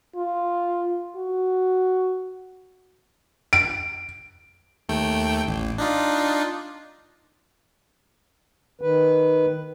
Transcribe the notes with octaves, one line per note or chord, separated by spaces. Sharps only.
F4
F#4
D7
D#2 A3 G5
A1
D4 D#4 F4
D#3 B4